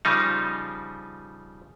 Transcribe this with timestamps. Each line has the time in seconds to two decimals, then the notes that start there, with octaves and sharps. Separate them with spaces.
0.05 C#3 F3 G3 D#4